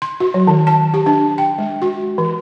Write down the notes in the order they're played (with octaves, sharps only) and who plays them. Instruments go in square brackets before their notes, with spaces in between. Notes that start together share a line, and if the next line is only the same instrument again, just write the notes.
[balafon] C6
F#4
F#3
D#3
A5
G4
D4
G5
G#3
F#4
E3